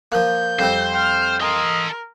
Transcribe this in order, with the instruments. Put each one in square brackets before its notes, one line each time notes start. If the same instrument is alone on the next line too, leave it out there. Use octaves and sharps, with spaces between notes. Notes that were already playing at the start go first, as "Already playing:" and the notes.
[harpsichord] F3 A#3 [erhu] G6
[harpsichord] F2 G3 C4 [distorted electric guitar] C5
[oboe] G5 [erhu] F6
[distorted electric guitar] A4 C6 [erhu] A#4 [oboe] D#5